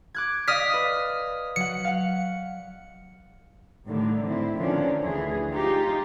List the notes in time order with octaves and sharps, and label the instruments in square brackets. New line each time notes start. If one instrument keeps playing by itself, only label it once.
[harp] D6 F#6 G#6
[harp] D5 D#5 F5 [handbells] D#6 F6 B6
[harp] B4
[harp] F#3 F#5 [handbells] C#7
[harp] F5 F#5
[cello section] A2 D3 D#3 G3
A2 C4 E4
D3 D#3 F3 C#4 D4
D2 E3 G#4
D#4 F4 G4